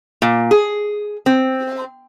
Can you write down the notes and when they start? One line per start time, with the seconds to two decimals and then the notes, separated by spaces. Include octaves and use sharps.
0.22 A#2
0.51 G#4
1.26 C4